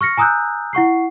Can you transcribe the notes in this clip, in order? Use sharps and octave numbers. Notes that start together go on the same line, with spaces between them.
C#6 F6 A#6 C#7
G#5 A#5 D#6 E6 F#6 G6
E4 F#5 C#6 C7